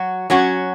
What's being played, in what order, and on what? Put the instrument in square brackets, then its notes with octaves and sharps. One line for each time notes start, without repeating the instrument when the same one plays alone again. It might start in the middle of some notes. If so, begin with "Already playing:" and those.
Already playing: [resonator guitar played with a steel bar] F#3 F#4
F#3 C#4 F#4